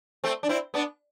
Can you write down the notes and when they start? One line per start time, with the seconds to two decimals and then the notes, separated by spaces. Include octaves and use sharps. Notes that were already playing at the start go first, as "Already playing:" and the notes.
0.24 A3 C4
0.43 D4
0.49 C4 E4
0.74 B3 D4